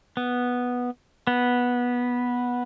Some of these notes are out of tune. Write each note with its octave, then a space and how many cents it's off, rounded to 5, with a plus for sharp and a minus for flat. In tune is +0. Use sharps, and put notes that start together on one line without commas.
B3 -5
B3 -10